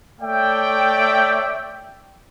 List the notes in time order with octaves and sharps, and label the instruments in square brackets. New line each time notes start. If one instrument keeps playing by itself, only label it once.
[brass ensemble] A3 C#5 D5 E5 G5